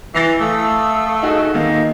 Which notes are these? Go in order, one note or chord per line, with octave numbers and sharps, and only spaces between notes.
E3 A6 A#6 C7
A3 F5 D#6 E6
D#4 F#4 G#4
D#3 A#3 D#5 F5